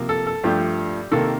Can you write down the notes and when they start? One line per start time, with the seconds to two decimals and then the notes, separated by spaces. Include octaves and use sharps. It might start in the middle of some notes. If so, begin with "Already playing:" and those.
Already playing: C3 F3 A#3
0.09 A4
0.27 A4
0.44 G2 F3 A3 G4
1.12 C3 D#3 A#3 A4